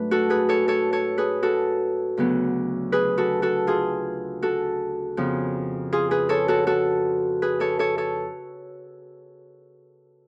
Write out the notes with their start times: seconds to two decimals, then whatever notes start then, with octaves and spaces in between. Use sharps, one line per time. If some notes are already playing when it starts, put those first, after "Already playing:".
Already playing: G#2 F#3 A3 D4 B4
0.11 F#4 A4
0.30 G#4 B4
0.49 A4 C#5
0.68 A4 C#5
0.92 A4 C#5
1.18 G#4 B4
1.43 F#4 A4
2.17 D2 C#3 F#3 B3
2.92 G#4 B4
3.18 F#4 A4
3.42 F#4 A4
3.67 F4 G#4
4.42 F#4 A4
5.17 F2 C#3 F3 B3
5.93 F4 G#4
6.11 G#4 B4
6.29 A4 C#5
6.48 F#4 A4
6.67 F#4 A4
7.42 G#4 B4
7.60 A4 C#5
7.79 A4 C#5
7.98 A4 C#5